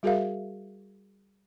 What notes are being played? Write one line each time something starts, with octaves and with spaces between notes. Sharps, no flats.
G3 F#4 G#4 A#4 E5 F5